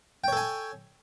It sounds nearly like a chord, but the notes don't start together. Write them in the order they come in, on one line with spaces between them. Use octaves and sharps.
G5 C#5 A4 G#5